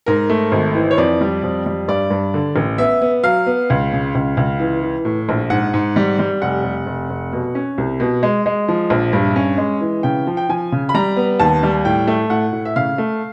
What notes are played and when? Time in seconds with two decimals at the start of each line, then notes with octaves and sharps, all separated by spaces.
0.06 G#2 A#4
0.29 A3
0.52 G#1
0.75 E3
0.91 C#5
0.98 F2 D5
1.21 G3
1.43 F2
1.66 G3
1.88 G2 D5
2.10 G2
2.34 D3
2.56 A1
2.78 B3 E5
3.02 B3
3.24 F#3 F5
3.46 B3
3.70 C#2
3.93 C#3
4.15 C#2
4.37 C#2
4.59 E3
4.83 E3
5.05 A2
5.29 A#1
5.50 G#2 F#5
5.74 G#2
5.96 G3
6.19 G3
6.42 F1 F#5
6.64 F1
6.86 F1
7.10 F1
7.32 B2
7.55 C#4
7.78 C2
8.00 B2
8.23 G#3
8.46 G#3
8.68 F3
8.90 A#1
9.13 G2
9.36 C#4
9.58 G#3
9.81 E3
10.03 C#3 G5
10.27 F3
10.37 G5
10.49 F3 G#5
10.72 C#3
10.89 B5
10.94 G3 A#5
11.16 B3
11.39 D#2 A5
11.63 G3
11.85 A2 G5
12.07 A3
12.30 A2 F#5
12.53 A2
12.65 E5
12.76 C#3 F5
12.98 A3